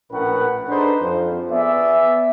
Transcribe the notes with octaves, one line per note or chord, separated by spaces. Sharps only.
A#1 A2 C#4 A#4 B4 F#5
D4 D#4 G#4 A4 B4 C5
F2
B3 G#4 D5 E5